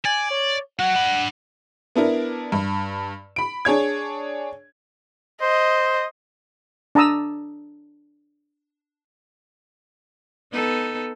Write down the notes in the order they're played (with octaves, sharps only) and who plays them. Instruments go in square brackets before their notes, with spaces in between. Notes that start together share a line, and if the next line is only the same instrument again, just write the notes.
[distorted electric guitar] D5 [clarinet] G#5
[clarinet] C#5
[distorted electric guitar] F#4 C#5 [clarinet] F#5
[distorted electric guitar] D4 B5
[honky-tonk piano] B3 D4 E4 A#4
G2
B5 D7
D4 G#4 C#5 G#6
[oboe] C5 [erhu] D#5
[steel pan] D4 A5 A#5 D#6 E6
[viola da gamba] B3 D#4 A4